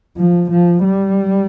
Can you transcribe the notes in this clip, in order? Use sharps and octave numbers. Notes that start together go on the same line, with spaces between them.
F3
F3
G3